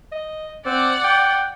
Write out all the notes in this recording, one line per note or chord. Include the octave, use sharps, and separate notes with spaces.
D#5
C4 D5 F#5
G5